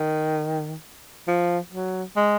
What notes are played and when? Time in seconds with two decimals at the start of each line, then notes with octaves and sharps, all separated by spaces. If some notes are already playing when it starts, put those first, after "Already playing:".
Already playing: D#3
1.28 F3
1.72 F#3
2.17 G#3